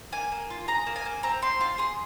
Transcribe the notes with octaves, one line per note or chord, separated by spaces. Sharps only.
A#3 G#5
A#3
F4
G#4 A#5
A#3
G#5
A#3
C4 A#5
C4 C6
F4 C6
G#4 C6